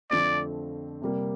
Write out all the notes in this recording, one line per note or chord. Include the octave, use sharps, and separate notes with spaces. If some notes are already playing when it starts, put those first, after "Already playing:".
F2 D3 F3 A3 C4 D5
C3 G3 A#3